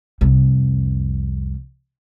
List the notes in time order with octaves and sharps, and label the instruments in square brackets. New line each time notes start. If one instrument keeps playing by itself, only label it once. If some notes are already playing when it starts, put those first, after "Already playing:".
[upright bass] C2 F2